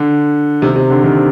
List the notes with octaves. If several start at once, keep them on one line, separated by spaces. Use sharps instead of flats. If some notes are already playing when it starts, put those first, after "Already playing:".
Already playing: D3
C3 D#3
C3
D3
C3 D#3